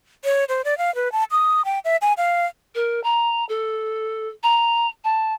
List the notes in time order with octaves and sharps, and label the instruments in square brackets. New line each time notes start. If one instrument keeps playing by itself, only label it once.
[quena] C#5
C5
D5
F5
B4
A5
D#6
G5
E5
G#5
F5
[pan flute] A#4
A#5
A4
A#5
A5